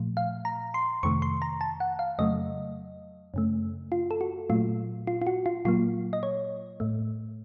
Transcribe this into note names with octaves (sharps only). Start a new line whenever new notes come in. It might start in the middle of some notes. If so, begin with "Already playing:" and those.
Already playing: A#2 F3 A3
F5
A#5
C6
F2 C3 D#3 A3 C#6
C6
A#5
A5
F#5
F5
F2 C#3 F#3 A3 D#5
F#2 C#3 A3
F4
A4
F#4
A#2 F#3 A3 F4
F4
F4
F#4
F4
A#2 F#3 A#3 F4
D#5
C#5
A2 A3